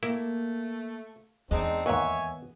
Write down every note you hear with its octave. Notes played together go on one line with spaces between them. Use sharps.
A3 A#3 E4
E2 G#3 C4 D4 D#4
D#2 G#2 B3 C#5 E5 G#5